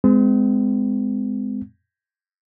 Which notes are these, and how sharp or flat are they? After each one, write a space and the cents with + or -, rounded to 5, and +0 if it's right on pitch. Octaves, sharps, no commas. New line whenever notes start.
G#3 +0 C4 -40